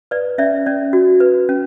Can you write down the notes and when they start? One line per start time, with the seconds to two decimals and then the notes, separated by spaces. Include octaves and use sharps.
0.11 B4 D5
0.38 C#4 D5 E5
0.66 C#4 D5
0.93 F#4
1.20 B4
1.49 C#4